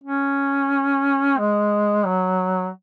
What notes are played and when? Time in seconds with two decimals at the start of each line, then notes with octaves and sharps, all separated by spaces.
0.03 C#4
1.38 G#3
2.06 F#3